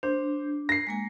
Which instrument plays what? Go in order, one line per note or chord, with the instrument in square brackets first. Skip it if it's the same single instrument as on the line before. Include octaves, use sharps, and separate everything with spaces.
[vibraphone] D4 [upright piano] C5
[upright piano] A#6 C7
[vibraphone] G#3 A#3 G#5